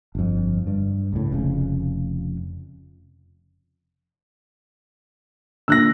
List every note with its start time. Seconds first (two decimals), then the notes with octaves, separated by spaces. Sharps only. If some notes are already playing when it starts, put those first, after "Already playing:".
0.15 G1 F2
0.67 G2
1.13 C#2 A2
1.32 F1 F2 C#3
5.68 A#2 D3 E6 F#6 A#6